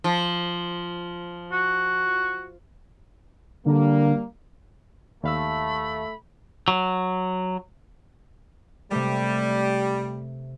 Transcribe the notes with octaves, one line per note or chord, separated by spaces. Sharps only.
F3
F#4
D3 G3 A#3
D#2 A3 F5 B5 E6
F#3
C3 G3 A3